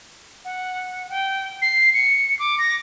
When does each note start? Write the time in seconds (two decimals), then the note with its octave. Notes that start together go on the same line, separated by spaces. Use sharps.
0.45 F#5
1.10 G5
1.62 C7
1.94 C#7
2.39 D6
2.59 A#6